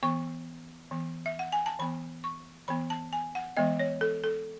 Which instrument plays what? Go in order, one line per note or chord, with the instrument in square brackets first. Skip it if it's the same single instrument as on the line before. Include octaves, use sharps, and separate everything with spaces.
[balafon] E3 B3 C#6
E3 B3
E5
F#5
G#5
A5
E3 B3 B5
C#6
E3 B3 B5
A5
G#5
F#5
E3 G#3 B3 D#5
C#5
A4
A4